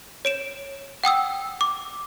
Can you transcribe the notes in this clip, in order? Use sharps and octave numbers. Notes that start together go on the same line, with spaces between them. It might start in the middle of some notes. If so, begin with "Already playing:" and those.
C#5 D7 E7
F#5 G5 D#6 E6
D6